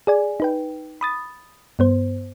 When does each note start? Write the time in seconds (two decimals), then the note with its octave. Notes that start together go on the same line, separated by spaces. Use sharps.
0.07 G#4 D5 G#5
0.40 D#4 B4 G5
1.01 B5 D#6 A6
1.79 G2 B3 C5